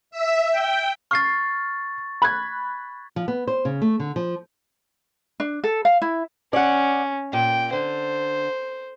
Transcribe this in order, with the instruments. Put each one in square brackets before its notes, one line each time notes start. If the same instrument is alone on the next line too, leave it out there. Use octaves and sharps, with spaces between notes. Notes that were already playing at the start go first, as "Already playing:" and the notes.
[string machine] E5
G5
[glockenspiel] C#6 A6 [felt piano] F6 C7
[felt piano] B5 F#6 G#6
[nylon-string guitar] F3
B3
C5
C#3
A3
D3
F3
[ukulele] D4
A4
F5
E4
[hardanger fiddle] C#4 [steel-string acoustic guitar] D5 F#5
[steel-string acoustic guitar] A#2 [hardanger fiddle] G5
[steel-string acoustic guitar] D3 [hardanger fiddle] C5